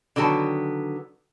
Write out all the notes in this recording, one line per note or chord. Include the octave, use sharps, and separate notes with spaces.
D3 D#3 F#3 B3 A5